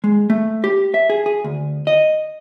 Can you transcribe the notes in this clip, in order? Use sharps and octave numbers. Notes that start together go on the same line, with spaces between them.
G#3
A3
G4
E5
G#4
G#4
D2
D#5